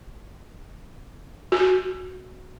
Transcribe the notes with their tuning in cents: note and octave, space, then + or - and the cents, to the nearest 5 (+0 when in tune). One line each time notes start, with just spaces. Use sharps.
F#4 +0